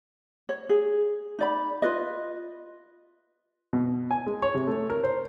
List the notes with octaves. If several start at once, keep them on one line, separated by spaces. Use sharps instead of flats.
C#5
G#4
D#4 D5 B5
F4 B4 D#5
B2
G#5
G#3
C#5
C3
A3
A#4
C5